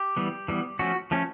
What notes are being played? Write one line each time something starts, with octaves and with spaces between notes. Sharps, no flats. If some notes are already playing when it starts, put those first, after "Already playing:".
Already playing: G4
E3 G3 B3
E3 G3 B3
F3 A3 C#4 F#4
F3 A3 C#4